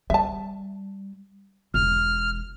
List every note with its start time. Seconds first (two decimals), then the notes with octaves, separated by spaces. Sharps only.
0.10 G3 E5 A5
1.74 E1 F6